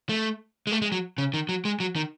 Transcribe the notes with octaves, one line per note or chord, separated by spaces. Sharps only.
A3
G#3
A3
G#3
F#3
C#3
D#3
F#3
G#3
F#3
D#3